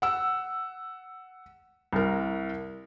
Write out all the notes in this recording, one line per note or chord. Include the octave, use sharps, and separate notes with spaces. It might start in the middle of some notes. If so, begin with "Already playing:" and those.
F#5 E6
C2 A#4